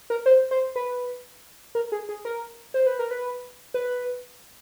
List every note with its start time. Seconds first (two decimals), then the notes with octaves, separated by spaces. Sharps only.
0.10 A#4
0.26 C5
0.51 C5
0.76 B4
1.75 A#4
1.92 G#4
2.09 G#4
2.25 A#4
2.74 C5
2.86 B4
2.99 A#4
3.11 B4
3.74 B4